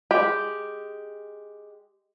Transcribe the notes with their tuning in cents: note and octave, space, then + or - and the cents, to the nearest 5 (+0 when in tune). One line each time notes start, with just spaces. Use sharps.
G#3 +0 G4 +0